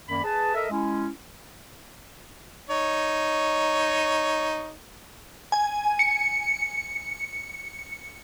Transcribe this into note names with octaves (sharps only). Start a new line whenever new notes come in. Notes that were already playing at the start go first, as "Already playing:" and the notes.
F#2 D#3 A#3 D5 B5
G#4 B4 A5
A4 A#4 D#5 E5
G#3 C#4 E4
D#4 C#5
G#5
C#7